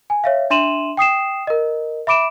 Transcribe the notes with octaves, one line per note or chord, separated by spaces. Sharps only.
G#5
C#5 E5 F5
D4 E5 C6 D#7 E7 F#7
G5 D#6 C7 E7
A#4 D#5
E5 B5 D6 D7 E7